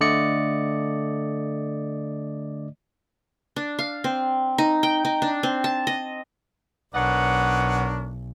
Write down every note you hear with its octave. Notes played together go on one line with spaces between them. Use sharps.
D3 A3 D5 D#5 C#7
D4
F5
C4
D#4
G5
D#4
D4
C4
A5
D#5
B1 D4 A#4 B4 C#5 D#5 F#5